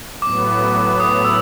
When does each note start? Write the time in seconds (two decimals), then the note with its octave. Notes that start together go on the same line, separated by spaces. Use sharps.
0.22 A2 F#3 B3 D6
0.48 D6
0.74 D6
1.00 D#6
1.25 E6